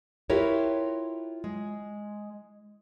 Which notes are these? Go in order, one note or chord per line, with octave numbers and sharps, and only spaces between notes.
E4 F4 G4 A#4 B4 C#5
G#3